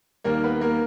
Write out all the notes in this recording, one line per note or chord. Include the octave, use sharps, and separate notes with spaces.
D#2 D#3 G3 A#3 A#4
B3 B4
A#3 A#4